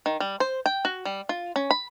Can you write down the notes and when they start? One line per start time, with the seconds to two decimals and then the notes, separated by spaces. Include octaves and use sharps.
0.06 D#3
0.20 G3
0.40 C5
0.66 G5
0.85 F#4
1.05 G3
1.29 F4
1.56 C#4
1.71 B5